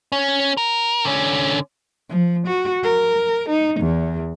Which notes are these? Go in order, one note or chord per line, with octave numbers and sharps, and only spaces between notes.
C#4
A#4
D3 C#4
F3
F#4
A#4
D#4
E2